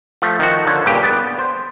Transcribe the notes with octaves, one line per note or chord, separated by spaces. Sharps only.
F3 A3
D#3 F3 F#4
D3 F3 C#5
G2 A#2 C#3 G4 G5
B3 D5
C5